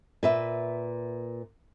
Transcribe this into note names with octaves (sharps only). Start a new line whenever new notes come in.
A#2 B4 E5